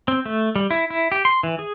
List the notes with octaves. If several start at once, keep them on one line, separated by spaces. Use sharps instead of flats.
C4
A3
G3
E4
E4
G4
C6
E3
G#4